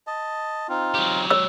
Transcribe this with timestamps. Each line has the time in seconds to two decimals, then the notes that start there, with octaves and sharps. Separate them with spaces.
0.07 D#5 A5
0.69 C4 D#4 F4
0.94 F#3 G4
1.30 C#5 E6